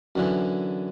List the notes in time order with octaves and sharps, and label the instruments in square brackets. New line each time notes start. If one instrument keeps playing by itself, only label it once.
[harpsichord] F#2 D3 E3